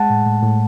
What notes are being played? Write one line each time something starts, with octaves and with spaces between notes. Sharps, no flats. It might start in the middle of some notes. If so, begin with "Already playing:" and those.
Already playing: G#3 F#5 A5
A2
A2
A2